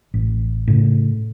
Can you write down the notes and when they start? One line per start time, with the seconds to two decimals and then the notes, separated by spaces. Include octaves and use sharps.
0.14 A1
0.68 A2 C#3